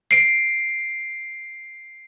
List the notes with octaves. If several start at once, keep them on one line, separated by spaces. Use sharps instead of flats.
C7 D7